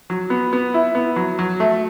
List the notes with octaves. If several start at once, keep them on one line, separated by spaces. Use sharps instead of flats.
F#3
B3
B3
E4
B3
F#3
F#3
A3